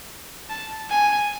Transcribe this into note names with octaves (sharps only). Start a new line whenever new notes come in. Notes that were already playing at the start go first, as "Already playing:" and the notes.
A5
G#5